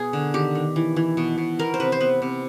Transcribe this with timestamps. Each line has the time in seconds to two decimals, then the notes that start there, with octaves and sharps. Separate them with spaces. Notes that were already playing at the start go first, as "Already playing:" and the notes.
Already playing: B2 G#4
0.13 D3
0.34 D#3 G4
0.55 D#3
0.76 E3
0.96 E3
1.17 B2
1.38 B2
1.59 B3 A#4
1.74 C5
1.80 C3 B4
1.92 C5
2.01 B3 B4
2.22 C3